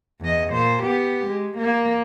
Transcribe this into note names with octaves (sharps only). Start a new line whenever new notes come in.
E2 D#5
A#2 C5
B3 G4
G#3
A#3